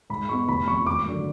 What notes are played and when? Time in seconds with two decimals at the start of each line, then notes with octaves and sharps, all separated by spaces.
0.10 G#2 B5
0.29 G#3 B3 C#6
0.48 F1 B5
0.67 F2 F3 C#6
0.86 G#1 D6
1.06 F#2 D3 F#3